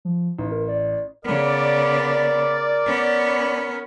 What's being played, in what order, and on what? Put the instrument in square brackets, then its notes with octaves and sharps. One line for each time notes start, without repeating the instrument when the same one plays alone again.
[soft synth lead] F3
[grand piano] A1 [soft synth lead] D#4
[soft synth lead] A#4
D5
[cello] C#3 B3 [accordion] A#4 [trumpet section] D5
[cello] B3 C#4